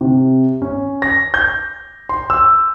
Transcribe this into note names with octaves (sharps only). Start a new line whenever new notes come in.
C3
C#4
A#6
G6
C6
E6